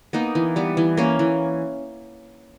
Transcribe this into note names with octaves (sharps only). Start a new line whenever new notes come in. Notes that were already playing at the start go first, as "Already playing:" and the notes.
A#3 B3 D#4
E3
G3 B3
E3
A#3 C#4
E3